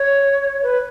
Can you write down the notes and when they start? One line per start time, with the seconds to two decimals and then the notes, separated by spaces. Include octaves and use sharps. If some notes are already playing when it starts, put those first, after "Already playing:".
Already playing: C#5
0.63 B4